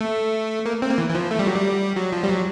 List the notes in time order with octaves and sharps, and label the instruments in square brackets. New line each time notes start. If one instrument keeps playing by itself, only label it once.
[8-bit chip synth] A3
A#3
C4
A#3
E3
E3
F3
A3
G3
F#3
G3
F#3
F3
G3
F#3